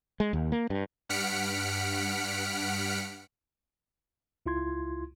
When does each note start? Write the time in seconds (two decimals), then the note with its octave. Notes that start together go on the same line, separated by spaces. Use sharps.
0.20 G#3
0.33 D#2
0.52 A#3
0.70 G2
1.09 G2 F#5 F6 B6 C#7 D7
4.46 C#2 E4 F4 C6 G#6